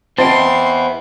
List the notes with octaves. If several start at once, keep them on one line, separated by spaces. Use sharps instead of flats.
B3 C4 E4 C5 D#5 G5 C6